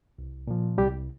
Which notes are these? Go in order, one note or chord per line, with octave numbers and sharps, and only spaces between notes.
C2
A#2 F3
C2 G3 G4